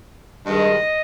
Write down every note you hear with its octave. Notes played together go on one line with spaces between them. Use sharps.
G2 D#3 G#3 D#5